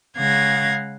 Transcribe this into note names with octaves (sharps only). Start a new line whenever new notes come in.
C#3 G#3 F5 F#5 G#6 A#6